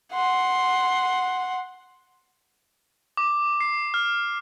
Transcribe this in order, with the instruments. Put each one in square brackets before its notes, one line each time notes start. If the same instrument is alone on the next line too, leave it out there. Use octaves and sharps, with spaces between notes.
[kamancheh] F#5 C6
[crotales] D6
C7
F6